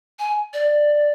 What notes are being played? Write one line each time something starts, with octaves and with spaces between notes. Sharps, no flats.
G#5
D5